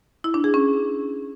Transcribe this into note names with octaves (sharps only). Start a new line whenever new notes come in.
E4
D4
G#4
C#4